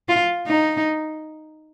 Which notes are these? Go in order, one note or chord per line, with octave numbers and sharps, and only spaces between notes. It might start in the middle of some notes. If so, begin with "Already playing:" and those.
F4
D#4